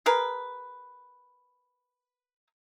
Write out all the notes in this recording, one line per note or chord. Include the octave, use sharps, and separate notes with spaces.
G#4 A#4 B4